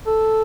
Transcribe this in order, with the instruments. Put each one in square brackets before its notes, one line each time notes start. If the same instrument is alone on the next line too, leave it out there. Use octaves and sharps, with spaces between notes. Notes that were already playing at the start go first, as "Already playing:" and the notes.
[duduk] A4